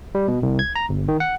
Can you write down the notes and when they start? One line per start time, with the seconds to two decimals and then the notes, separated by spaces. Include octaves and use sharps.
0.15 G3
0.28 B2
0.43 C2
0.59 G#6
0.76 A#5
0.89 G1
1.08 D#3
1.20 F#5